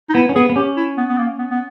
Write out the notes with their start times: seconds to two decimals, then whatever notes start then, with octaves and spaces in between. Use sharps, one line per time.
0.10 D#4
0.14 B3 E4
0.29 C#4
0.36 B3 G#4
0.50 B3
0.56 C#4 G4
0.77 E4
0.97 B3
1.09 B3
1.18 A#3
1.39 B3
1.51 B3